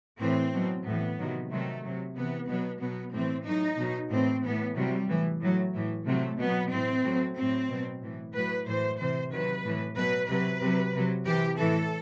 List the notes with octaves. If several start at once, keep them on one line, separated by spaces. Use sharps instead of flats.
A2 E3 C4
B2 F#3
A2 E3 B3
C3 D#3 F#3
C3 D#3 F#3 A3
C3 F#3
C3 E3 B3
B2 F#3 B3
B2 F#3 B3
A2 E3 C4
A2 F#3 D#4
B2 F#3
A2 E3 C4
A2 E3 B3
C3 F#3 G3
A2 E3
A2 F#3
A2 E3
C3 F#3 A3
B2 F#3 B3
A2 E3 C4
A2 F#3
A2 F#3 C4
B2 F#3
A2 E3
A2 F#3 B4
A2 E3 C5
C3 E3 C5
C3 D#3 F#3 B4
A2 E3
B2 F#3 B4
C3 F#3 B4
C3 F#3
C3 F#3
C3 E3 G4
A2 E3 A4